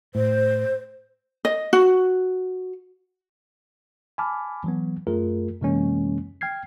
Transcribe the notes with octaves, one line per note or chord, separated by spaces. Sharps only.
A2 C5
D#5
F#4
G#5 A5 B5 D6 F6
E3 F#3 B3
F#2 A3 F4 G#4 A#4
F#2 C3 E3 G#3 A#3 C#4
G5 F6 G#6 C7